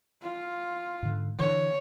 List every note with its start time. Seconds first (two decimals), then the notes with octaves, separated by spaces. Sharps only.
0.22 F4
1.03 G#2 D3
1.39 D3 E3 C#5